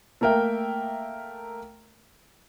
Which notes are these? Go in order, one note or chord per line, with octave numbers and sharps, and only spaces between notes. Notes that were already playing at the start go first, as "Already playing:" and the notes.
A3 A#3 A#4 E5 G5